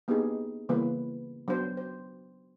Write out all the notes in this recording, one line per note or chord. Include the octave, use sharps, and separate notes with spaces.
A#3 B3 D4 D#4 G4 G#4
C#3 E3 G3 A#3 B3 B4
F#3 B3 D4 C5
C5